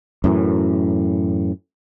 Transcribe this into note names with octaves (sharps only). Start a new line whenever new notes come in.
F#2 A2 E3